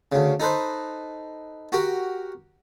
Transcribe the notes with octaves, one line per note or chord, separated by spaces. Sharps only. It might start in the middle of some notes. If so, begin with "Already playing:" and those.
D2 C#3
D#4 A4 B4 C5
F#4 G4 A#4